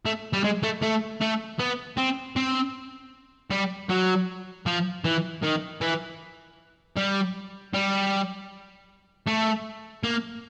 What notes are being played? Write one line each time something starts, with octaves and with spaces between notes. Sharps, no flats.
A3
G3
G#3
A3
A3
A3
B3
C4
C4
G3
F#3
F3
E3
D#3
E3
G3
G3
A3
A#3